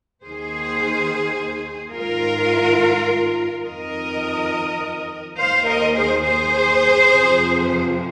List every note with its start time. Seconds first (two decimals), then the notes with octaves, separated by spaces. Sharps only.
0.23 D#2 D#3 G#4 C5
1.94 G#2 D#3 F4 A#4
3.65 F2 D#3 A#4 D#5
5.37 D#2 D#3 C5 F5
5.65 A#4 D#5
5.94 G#4 C5
6.23 G#4 C5
7.09 F2 C3 F3